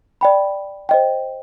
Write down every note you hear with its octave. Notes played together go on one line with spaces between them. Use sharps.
D5 G5 B5
C5 D#5 G5